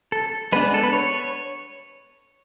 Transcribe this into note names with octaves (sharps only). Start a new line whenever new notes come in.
A4
G#3 B3 D4 B4
A4
B4
C#5